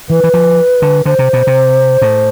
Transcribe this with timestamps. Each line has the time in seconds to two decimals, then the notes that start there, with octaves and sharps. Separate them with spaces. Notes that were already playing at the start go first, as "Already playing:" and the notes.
0.10 E3 B4
0.24 E3
0.34 F3
0.82 D3
1.06 D3 C5
1.19 C3
1.33 B2
1.47 C3
2.02 A2